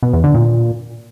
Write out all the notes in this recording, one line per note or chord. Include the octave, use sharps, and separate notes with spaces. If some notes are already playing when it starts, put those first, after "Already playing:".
B2
E2
D3
A#2